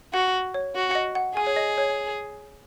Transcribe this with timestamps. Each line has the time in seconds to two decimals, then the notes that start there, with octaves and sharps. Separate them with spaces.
0.13 F#4 F#5
0.54 C#5
0.75 F#4
0.91 F#5
0.95 D#5
1.15 F#5
1.36 G#4 G#5
1.47 C#5
1.56 D#5
1.78 C#5